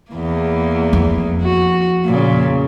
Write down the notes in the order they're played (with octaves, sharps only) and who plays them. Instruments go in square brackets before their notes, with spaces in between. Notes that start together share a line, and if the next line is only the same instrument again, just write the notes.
[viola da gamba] E2 A#3
[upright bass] F2
[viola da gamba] F#4
A#2 C#3